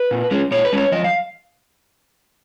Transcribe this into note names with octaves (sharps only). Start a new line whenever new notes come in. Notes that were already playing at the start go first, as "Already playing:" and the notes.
Already playing: B4
A#2
G#3 C#4
A#2 C#5
B4
G#3 C#4 C#5
F3 D#5
F5